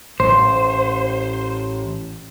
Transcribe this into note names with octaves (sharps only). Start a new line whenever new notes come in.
A1 C5